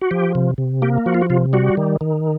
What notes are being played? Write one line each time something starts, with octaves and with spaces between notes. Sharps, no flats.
F#4
F3 G4
C3
C3
A#3 G4
F3 F#4
F4
F#4
C3 F4
G3 F#4
D#3
D#3